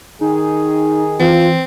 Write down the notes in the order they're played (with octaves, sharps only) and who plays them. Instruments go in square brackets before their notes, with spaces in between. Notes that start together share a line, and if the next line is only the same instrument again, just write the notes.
[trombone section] D#3 G#4 [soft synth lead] D#4
[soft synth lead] E3 [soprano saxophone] C4 [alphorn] F4